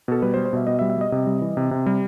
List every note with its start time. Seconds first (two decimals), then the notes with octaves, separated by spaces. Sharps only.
0.08 B2 A4
0.22 G3 B4
0.34 C5
0.37 G3
0.45 C5
0.53 B2 E5
0.67 B2 D#5
0.79 E5
0.81 G3
0.90 E5
0.97 G3 D#5
1.12 C3 D#5
1.27 G3
1.41 E3
1.57 C3
1.71 C3
1.86 G3